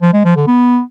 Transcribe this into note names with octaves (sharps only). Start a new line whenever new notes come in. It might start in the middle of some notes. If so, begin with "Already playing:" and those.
F3
G#3
F3
D3
B3